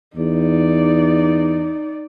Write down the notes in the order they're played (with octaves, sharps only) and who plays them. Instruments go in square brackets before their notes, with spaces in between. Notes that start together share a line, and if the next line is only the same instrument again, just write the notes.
[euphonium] E2 [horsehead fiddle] D#4 D5